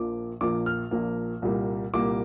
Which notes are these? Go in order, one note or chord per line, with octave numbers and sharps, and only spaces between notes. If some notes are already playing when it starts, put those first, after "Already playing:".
Already playing: A#1 A#2 F3 A#3 D6
A#1 A#2 F3 A#3 D6
F6
A#1 A#2 F3 A#3
C2 A#2 G3 A#3
C2 A#2 G3 A#3 D6